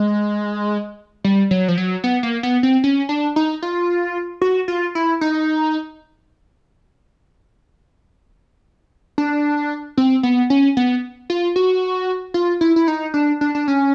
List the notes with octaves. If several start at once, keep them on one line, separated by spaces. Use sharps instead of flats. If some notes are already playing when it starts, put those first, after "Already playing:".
Already playing: G#3
G3
F#3
F3
F#3
B3
A#3
B3
C4
C#4
D4
D#4
F4
F#4
F4
E4
D#4
D4
C4
B3
C#4
B3
F4
F#4
F4
E4
E4
D#4
D4
D4
D4
C#4